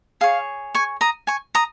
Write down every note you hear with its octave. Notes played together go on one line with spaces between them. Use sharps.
G#4 C#5 F5
G#5 C#6
A#5 D#6
G#5 C#6
A#5 D#6